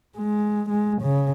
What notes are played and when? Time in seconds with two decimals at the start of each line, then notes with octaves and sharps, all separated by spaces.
0.17 G#3
0.69 G#3
1.02 C#3